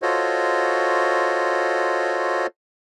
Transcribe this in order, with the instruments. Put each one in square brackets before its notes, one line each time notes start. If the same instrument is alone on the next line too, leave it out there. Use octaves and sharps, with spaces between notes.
[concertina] F4 F#4 A4 C5 C#5 D#5